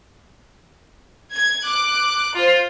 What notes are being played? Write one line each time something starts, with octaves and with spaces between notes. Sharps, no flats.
G#6
D6 F#6
F4 C5